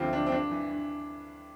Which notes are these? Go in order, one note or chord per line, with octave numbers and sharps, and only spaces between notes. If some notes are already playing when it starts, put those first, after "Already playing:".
Already playing: D2 D3 F3 C4 E4 F4 G4
D3 F3 D4
C4
G2 D4
E3
G2